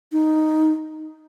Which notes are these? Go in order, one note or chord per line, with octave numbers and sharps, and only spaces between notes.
D#4